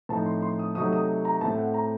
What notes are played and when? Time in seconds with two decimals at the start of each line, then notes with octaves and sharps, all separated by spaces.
0.09 A2 F3 C4 D#4 A5
0.26 C6
0.42 C6
0.59 D#6
0.75 C3 F#3 A3 D#4 D#6
0.93 D#6
1.25 A#5
1.41 A2 A3 C4 A5
1.58 F#5
1.74 A#5